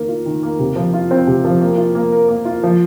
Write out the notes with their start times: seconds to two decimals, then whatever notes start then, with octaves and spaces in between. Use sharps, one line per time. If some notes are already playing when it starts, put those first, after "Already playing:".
Already playing: D#3 A#3 A#4
0.09 F4
0.26 D#3
0.43 A#3
0.59 C3
0.76 F3
0.93 F4
1.11 C4
1.27 C3
1.45 F3
1.61 A#3
1.78 F4
1.95 A#3
2.12 A#4
2.28 A#3
2.45 F4
2.63 F3